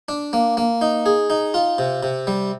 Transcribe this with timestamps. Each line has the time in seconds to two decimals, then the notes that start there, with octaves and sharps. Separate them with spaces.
0.09 D4
0.33 A#3
0.57 A#3
0.81 D#4
1.06 G#4
1.30 D#4
1.54 F4
1.78 C3
2.03 C3
2.27 G3